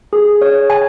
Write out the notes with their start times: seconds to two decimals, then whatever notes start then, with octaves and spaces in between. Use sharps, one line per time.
0.13 G#4
0.41 C#5
0.70 G#5